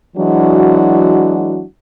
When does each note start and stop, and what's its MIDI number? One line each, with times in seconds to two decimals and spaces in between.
0.16 1.63 52
0.16 1.63 54
0.16 1.63 56
0.16 1.63 62
0.16 1.63 64
0.16 1.63 66